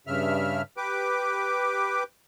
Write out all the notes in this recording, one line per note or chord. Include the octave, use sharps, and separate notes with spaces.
G2 C#3 E5 F6
G4 B4 D6